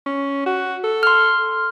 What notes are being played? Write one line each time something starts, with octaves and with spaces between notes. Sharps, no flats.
C#4
F#4
A4
C6 F6